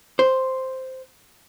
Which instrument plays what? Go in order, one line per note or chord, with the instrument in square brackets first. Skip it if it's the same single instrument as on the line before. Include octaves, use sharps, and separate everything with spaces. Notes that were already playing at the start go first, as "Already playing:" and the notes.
[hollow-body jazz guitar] C5